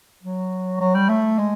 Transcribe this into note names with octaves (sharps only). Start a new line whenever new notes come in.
F#3
F#3
G3
A3
G#3